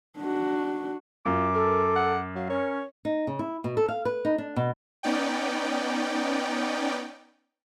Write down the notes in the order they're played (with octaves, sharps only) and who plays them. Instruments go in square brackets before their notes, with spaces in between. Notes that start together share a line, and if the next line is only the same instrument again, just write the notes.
[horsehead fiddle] D4 F#4
[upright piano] F#2 [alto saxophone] F4 [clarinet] D6
[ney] A4 [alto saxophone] A#4
[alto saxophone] F#5
[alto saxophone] F#3 [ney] F5
[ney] C#4 [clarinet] A#4 [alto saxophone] C#5
[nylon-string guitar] D#4
C#3
E4
B2
A4
F5
B4
D#4
D4
B2
[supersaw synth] B3 C#4 D#4 D5 G5